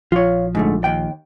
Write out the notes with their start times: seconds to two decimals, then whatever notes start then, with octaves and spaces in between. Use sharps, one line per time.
0.12 A#1 F3 F4 C#5
0.55 G#2 D3 A3
0.84 D#2 G5